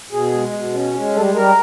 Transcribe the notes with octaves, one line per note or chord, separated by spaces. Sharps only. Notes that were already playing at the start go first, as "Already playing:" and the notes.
B2 G#4
G#3
B2
C#4
G#3
G3 A4
G3 A#4